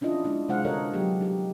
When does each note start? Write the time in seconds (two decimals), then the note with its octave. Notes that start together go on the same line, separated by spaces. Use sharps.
0.01 C#4 D4 E4 F4 D#5
0.24 G#3 D4 E4
0.49 C3 G#3 C5 F5 F#5
0.65 D3 F#4 A4 A#4 C#5 D#5
0.93 F#3 B3 G4 G#4
1.21 D#4 G4